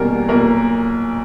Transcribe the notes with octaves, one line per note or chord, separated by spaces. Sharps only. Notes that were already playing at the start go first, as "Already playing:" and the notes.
Already playing: E2 B2 G3 A#3 C#4 A#4
B1 A#2 A#3 A#4